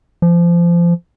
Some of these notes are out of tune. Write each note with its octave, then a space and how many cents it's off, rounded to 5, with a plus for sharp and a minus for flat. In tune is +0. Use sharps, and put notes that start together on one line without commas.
F3 -25